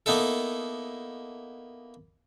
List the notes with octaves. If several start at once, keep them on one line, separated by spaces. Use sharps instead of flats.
A#3 B3 D#4 E4 A4